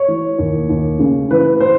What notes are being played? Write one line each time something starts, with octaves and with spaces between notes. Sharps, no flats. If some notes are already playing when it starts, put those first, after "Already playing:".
Already playing: C#5
E3
D#2
D#2
C#3
E3 B4
C5